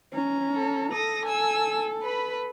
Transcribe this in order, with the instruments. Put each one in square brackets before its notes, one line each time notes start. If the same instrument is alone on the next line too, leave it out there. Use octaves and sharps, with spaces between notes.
[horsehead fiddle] C#4 A#5
[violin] A4
[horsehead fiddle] A4 [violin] D#6 A#6
[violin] G#5 E6
B4 B5